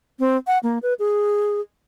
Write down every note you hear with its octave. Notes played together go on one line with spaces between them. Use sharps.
C4
F#5
A#3
B4
G#4